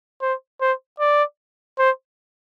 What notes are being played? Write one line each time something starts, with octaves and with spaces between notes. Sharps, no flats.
C5
C5
D5
C5